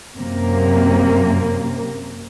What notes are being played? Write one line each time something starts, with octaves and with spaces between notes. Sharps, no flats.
F#2 C3 A#3